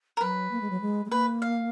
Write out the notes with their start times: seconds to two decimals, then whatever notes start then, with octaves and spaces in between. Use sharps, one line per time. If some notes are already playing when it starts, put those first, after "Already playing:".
0.17 A#4
0.21 F#3 B4
0.51 A#3
0.61 G#3
0.70 F#3
0.81 G#3
1.06 G#3
1.11 A#3 B4
1.42 F5